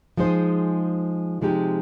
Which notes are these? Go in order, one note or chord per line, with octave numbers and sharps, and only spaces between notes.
F3 G#3 D#4 G#4 C5
C3 F3 G#3 D#4 G4